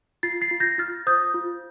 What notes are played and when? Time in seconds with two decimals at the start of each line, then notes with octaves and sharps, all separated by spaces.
0.23 F4 A6 C7
0.41 A6 C7
0.51 F4
0.60 G6 A#6
0.78 F4 F6 A6
1.07 C5 D#6 G6
1.34 F4